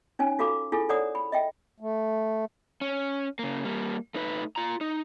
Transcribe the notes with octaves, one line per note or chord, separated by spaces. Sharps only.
C#4 D#4 C#5 G#5
F4 F#4 A4 F5 A#5 D6
E4 F4 G#4 A4 G#5
A4 C#5 D5 F#5 A#5 D#6
B5
D#5 E5 G5
A3
C#4
C#3 A#3
G3 A#3
A3 D#4 B4
F4 A#5
D#4